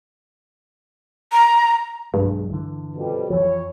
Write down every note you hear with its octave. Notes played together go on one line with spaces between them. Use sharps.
A#5
B1 G2 F#3 G#3
D3 E3
F2 B2 G3
F2 E3 F3 C#5